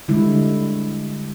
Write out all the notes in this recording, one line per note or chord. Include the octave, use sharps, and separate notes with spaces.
D3 G3 G#3 E4